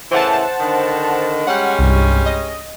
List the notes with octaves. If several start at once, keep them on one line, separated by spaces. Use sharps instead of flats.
A2 C#3 E3 C5 F#5 A5
D3 D#3
G3 G#3 C#4 F#5
C2 G2
D#5